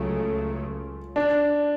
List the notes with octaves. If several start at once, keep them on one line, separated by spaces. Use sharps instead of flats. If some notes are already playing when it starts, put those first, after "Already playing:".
Already playing: C#2 C#3 F#3 A3 C#4 F4
D4